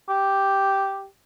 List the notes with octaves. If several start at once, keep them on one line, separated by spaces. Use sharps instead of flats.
G4